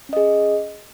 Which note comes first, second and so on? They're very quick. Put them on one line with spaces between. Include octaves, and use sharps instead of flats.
C#4 D#5 G#4